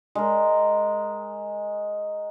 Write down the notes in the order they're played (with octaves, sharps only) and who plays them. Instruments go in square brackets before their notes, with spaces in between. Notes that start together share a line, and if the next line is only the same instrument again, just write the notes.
[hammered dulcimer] G#3 A#4